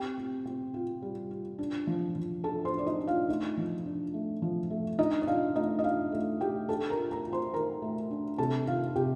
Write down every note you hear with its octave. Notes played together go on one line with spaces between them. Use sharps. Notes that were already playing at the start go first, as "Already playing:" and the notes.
Already playing: C4 G4 G5
C4
C4
F4
G3
F4
D4
F3
F3
D4 A4 A5
C5 C6
D4
D5
D#4 D#5
D4
F4 F5
A3 D#4 D#5
F3
D4
A3
F3
A3
D4 D#4 D#5
D#5
D4 F4 F5
A3 D#4 D#5
D#5
D4 F4 F5
A3
A3 G4 G5
D4 A4 A5
A#4 A#5
F4
A#4 A#5
F4
C5 C6
D#3 A#4 A#5
A3
D4
C3 A4 A5
D#3 F4 F5
C3 G4 G5